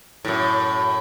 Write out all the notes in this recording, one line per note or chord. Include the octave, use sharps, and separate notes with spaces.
F#2 A2